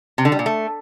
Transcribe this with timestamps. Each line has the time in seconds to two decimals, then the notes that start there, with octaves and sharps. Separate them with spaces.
0.18 C3
0.25 D3
0.32 G3
0.39 A#2
0.46 A3